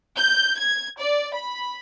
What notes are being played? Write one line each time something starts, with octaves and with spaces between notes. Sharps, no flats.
G6
G#6
D5
B5